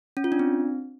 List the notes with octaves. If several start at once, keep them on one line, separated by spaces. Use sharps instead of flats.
C#4
F4
D4
C4